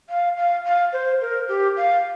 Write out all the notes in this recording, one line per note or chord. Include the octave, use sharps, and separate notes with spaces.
F5
F5
F5
C5
A#4
G4
F5